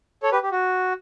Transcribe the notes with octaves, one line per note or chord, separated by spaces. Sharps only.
A4 C#5
G4 B4
G4
F#4